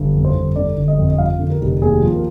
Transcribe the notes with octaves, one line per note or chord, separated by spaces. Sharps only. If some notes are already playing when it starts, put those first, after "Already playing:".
Already playing: G1
F2
C5
G1
D3 D5
G1
D#5
F2
D#5
F3 F5
D3
A#4
F1
D#2 G#4
F3
A#4